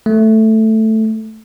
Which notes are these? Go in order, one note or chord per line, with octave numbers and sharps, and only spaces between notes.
A3